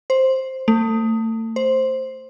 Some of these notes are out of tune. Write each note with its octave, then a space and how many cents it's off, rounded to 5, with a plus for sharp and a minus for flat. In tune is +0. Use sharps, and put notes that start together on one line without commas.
C5 +5
A3 +35
C5 +5